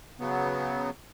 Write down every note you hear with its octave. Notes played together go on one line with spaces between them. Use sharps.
C#3 F#3 B3